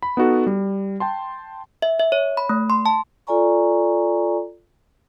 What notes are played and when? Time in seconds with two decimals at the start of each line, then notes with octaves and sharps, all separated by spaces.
0.02 B5
0.17 B3 D#4 F#4 A4
0.46 G3
1.00 G5 A5 C6
1.82 E5
2.00 E5
2.12 C#5
2.37 B5
2.49 A3
2.70 C6
2.86 A5
3.27 F4 A4 D5 G#5 A#5 C#6